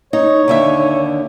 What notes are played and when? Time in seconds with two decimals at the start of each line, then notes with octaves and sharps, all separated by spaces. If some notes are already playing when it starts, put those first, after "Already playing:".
0.13 D#4 C#5
0.48 D#2 D3 E5